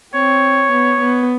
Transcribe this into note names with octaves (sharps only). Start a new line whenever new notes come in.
C4 C#5
B3
B3